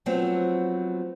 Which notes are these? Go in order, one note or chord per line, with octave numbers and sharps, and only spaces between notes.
F3 F#3 A3 B3 C4